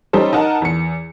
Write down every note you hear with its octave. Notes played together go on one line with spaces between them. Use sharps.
G3 C#4 D#4 A4 C5
D#4 A#4 F#5 A5
E2 C#7